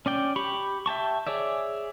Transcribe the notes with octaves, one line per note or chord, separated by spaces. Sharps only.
C#4 D5 G5
G4 B5 C#6
E5 G5 A5 C#6
G#4 C#5 D5 E5